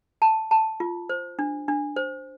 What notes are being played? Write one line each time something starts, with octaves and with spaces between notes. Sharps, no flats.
A5
A5
F4
C5
D4
D4
C5